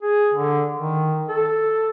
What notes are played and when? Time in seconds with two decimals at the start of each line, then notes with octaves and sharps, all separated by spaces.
0.02 G#4
0.34 D3
0.76 D#3
1.29 A4